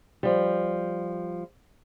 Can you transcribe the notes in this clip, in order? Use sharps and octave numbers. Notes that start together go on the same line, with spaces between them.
F3 G3